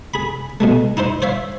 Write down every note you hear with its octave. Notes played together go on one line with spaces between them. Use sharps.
G#4 B5
B2 G#3 A3
D#4 E4 C5 C6
C5 C#5 E5 F5